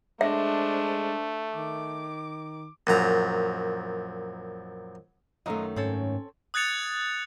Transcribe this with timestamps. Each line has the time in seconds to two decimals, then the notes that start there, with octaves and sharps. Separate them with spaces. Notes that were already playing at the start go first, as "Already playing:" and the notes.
0.21 G#3 A3 D4 C5 E5
1.55 D#3 D6
2.87 A#1 F#2 A#5
5.46 F#2 D#3 F#3 A3 F4 D#5
5.76 G#2 C4 C#4 A4 C#5
6.54 D#6 F#6 G#6 A6 C#7 F7